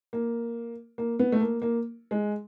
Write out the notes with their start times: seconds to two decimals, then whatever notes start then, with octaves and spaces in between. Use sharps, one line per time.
0.13 A#3
0.98 A#3
1.19 B3
1.32 A3
1.41 A#3
1.62 A#3
2.11 G#3